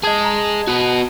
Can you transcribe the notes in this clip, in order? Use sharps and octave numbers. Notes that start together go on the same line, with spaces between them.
G#4 D#5 A5 D#6 G#6
A#5
B3 F#4